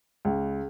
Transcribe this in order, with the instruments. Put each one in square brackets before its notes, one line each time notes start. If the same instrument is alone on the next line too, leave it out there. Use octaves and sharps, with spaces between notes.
[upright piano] C#2